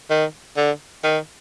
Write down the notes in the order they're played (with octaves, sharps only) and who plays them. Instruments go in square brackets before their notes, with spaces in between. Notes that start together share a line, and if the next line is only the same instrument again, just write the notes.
[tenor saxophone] D#3
D3
D#3